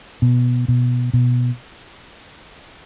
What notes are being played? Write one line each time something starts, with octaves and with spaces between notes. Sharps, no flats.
B2
B2
B2